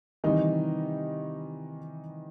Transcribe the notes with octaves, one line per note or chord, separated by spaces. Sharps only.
C3 D#3 E3 G3 D#4